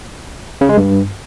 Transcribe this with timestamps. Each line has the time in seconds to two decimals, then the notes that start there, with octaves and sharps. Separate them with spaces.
0.61 C#3
0.69 G#3
0.77 G2